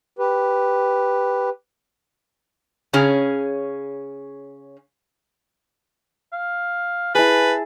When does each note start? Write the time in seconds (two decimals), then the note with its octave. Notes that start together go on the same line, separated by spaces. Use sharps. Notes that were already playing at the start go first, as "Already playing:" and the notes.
0.19 G4 B4
2.93 C#3 C#4 G#4
6.32 F5
7.15 E4 G#4 B4 A5